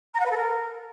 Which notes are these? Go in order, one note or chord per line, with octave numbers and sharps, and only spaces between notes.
A#5
F#5
B4
A4
A#4